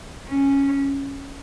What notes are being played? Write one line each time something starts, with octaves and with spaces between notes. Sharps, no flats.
C#4